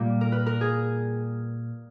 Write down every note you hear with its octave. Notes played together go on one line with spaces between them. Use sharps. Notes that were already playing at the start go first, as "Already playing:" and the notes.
Already playing: A#2 G3 A#3
A#4
B4
A#4
G#4